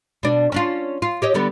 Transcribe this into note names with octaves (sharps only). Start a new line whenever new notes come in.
B2 D4
C#4 D4 F4
F4
G4 C#5 D#5
D3 G3 B3